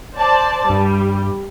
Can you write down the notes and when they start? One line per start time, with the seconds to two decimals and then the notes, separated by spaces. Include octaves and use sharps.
0.15 C5 D5 A5
0.70 G2 G3